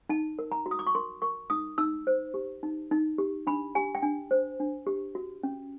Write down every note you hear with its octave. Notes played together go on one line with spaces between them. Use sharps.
D#4 A5
A#4
A#5
F#4
D#6
D6
C#6
A#4 C6
A#4 C#6
D#4 D#6
D#4 E6
C5
G4
D#4
D#4
G4
D4 B5
G4 G#5
G5
D4 G#5
C5
D4
G4
F#4
C#4